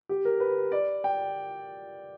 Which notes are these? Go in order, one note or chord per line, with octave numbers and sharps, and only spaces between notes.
G4
A#4
B4
D5
G5